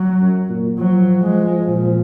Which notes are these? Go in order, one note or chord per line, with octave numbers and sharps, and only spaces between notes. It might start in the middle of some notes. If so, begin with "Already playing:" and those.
Already playing: F#3
F#2
A#2
F3 F#3
G#3
A#2